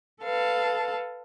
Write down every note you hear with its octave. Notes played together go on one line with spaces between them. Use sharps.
A4 B4 F5 A5